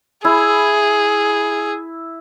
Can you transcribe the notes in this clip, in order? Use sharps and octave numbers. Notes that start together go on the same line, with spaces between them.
E4 G#4